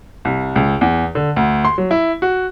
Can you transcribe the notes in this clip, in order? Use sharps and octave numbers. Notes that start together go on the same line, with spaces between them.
C2
C#2
E2
D3
D2
C6
F#3
E4
F#4